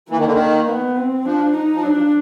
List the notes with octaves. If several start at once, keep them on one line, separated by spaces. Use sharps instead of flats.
E3 A#3
D#3
D3
D#3
B3
C4
F3 D4
D#4
F3
F#3 D4
F3